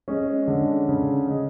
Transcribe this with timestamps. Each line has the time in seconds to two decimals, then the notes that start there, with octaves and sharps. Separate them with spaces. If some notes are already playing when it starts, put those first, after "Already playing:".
0.08 G#3 C#4
0.47 D3
0.89 C#3
1.28 G#3